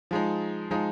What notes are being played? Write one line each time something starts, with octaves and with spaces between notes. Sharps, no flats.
F3 G#3 D#4
F3 G#3 D#4